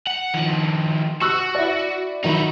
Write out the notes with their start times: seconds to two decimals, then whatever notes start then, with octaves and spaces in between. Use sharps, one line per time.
0.07 F#5
0.34 D#3 F3
1.21 F#4 C#6 E6 F#6
1.55 E4 D5
2.24 D#3 F#3 D#4 E4